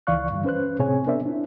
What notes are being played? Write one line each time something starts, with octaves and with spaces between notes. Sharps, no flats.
C#2 E3 D5 F5 C#6 F#6
G2 D3 E3 G3
C#4 B4 C5 F#6
A2 C3 C4 G#4 C#5 G#5
B3 D4 A#4 C5 D5 E5
D4 E4